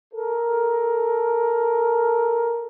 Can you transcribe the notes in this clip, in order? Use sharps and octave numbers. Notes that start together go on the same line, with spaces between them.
A4 A#4